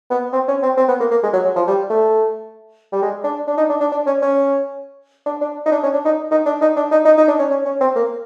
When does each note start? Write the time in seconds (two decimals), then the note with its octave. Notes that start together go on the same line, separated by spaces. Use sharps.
0.11 B3
0.33 C4
0.49 C#4
0.63 C4
0.77 C4
0.89 B3
1.00 A#3
1.11 A#3
1.23 G#3
1.33 F#3
1.45 F#3
1.56 F3
1.67 G3
1.90 A3
2.93 G3
3.02 G#3
3.24 D4
3.48 D4
3.58 D#4
3.70 D4
3.81 D4
3.92 D4
4.07 C#4
4.22 C#4
5.26 D4
5.42 D4
5.66 D#4
5.72 D4
5.83 C#4
5.93 D4
6.05 D#4
6.31 D#4
6.46 D4
6.61 D#4
6.77 D4
6.92 D#4
7.05 D#4
7.18 D#4
7.28 D4
7.39 C#4
7.50 C#4
7.65 C#4
7.81 C4
7.96 A#3